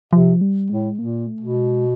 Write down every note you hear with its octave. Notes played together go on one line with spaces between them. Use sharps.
C3 F3
G3
A2 G#3
A#2 A#3
A3
B2
G#3